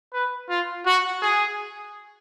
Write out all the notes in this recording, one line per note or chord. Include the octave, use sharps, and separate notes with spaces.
B4
F4
F#4
G#4